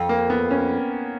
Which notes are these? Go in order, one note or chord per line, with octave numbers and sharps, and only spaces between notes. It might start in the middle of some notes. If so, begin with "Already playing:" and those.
Already playing: F2
A#3
B3
C#4